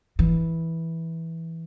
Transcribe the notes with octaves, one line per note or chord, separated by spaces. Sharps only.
E3